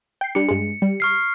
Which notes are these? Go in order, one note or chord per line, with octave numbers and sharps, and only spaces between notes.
G5 C7
G3 D4 C#7
G2 G#3
G3
C#6 F6 C7